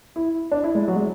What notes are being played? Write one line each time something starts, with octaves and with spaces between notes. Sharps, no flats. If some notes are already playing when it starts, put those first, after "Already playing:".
E4
D4
E4
G#3
F#3
G#3